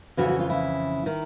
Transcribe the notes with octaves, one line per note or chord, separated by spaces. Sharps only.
F2 C#3 E3 F#4
F#4
F4
E4
D#3